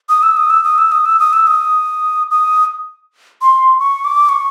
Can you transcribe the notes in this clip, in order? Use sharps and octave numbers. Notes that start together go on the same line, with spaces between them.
D#6
E6
D#6
E6
D#6
E6
D#6
E6
D#6
E6
D#6
D#6
C6
C#6
D6
C#6